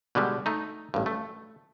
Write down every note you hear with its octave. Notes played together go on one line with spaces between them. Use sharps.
B2 D3 G3 G#3
A3 D#4
A1 G2
A3